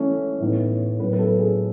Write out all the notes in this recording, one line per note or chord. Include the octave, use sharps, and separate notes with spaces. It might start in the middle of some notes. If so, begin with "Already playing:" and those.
Already playing: E3 A3 C#4
A2 E3 B3 D#4
A2 F#3 B3 B4
B4
A4
G#4